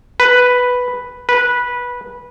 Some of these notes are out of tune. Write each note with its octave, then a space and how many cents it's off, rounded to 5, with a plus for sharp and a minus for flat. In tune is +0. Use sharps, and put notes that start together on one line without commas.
B4 +0
B4 -15